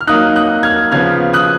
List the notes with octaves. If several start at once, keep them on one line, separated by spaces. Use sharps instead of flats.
F6
F#3 A#3 D#4 D#6 F#6
D#6 F#6
F6 G#6
C#3 F3 B3 F6 G#6
D#6 F#6